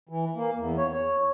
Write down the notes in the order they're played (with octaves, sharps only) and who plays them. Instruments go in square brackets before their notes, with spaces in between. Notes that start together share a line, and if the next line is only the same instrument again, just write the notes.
[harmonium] E3
A#3
E2
C#5
C#5